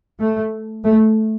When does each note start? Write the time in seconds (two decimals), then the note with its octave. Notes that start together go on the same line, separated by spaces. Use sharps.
0.20 A3
0.84 A3